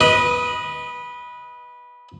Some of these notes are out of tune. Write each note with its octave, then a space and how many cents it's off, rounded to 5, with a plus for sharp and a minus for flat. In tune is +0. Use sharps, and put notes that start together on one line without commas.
B4 -15 D#5 +15 D#6 +0